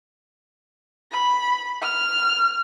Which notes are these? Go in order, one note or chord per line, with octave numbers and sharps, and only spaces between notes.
B5
F6